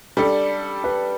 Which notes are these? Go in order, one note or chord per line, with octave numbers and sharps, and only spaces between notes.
G3 D4 A4 D5
B4